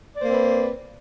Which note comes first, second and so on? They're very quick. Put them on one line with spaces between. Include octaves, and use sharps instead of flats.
D5 C5 A#3 C4 B4